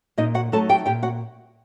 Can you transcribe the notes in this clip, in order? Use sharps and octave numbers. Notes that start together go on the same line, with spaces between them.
A#2 D#4 D#5
F#4 F#5
F#3 A3 D#4 A4 A5
G4 G5
A#2 G4 G5
F#4 F#5